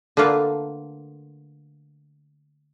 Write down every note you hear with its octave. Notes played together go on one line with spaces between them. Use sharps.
D3 A3 A#3 F4 B4